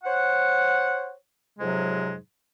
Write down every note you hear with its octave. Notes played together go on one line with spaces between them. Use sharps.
C5 C#5 F#5
F2 G#2 C3 F#3 G#3